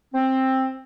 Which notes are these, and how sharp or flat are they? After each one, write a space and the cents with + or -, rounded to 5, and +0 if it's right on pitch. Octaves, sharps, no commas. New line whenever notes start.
C4 +10